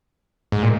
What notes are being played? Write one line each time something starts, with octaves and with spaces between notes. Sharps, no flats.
G#2
A#2